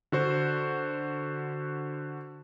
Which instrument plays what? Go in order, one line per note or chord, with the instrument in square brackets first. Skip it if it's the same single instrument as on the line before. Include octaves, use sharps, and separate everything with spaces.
[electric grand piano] D3 F#4 C5